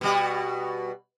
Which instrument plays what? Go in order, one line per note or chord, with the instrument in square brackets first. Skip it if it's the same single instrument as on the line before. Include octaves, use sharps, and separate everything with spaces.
[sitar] B2 G3 F#4